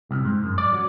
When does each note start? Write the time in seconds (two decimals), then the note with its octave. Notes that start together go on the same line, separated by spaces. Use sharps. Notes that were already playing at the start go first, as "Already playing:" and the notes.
0.11 C2
0.25 G#2
0.43 F#2
0.58 D5
0.73 F#3